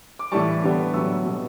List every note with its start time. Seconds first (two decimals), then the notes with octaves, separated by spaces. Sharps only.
0.19 D6
0.32 A2 E3 G3 A5 C#6
0.62 D3 G3 B3
0.93 A2 F#3 B3 C#6 E6
1.25 B2 G3 B3